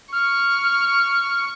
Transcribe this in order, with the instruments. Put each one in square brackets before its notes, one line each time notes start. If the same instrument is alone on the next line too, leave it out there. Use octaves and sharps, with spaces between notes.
[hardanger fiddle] C#6 [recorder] F6